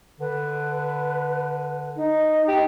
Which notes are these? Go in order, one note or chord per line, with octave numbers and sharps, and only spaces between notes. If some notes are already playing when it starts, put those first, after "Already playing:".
D3 B4
D#4
G4